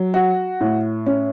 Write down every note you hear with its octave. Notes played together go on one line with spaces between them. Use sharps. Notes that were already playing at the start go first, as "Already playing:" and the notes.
Already playing: F#3
F#4
A2
C#4